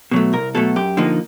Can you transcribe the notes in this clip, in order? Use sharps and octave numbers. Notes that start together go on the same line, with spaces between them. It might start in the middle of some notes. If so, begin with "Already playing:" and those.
B2 F#3 A3
C2 A#4
B2 F#3 A3 A4
F#2 G4
D3 F3 A#3 D#4